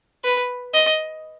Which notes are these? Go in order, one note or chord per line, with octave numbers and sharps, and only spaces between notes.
B4
D#5